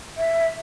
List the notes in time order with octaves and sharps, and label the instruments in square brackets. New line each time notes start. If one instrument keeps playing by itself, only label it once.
[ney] E5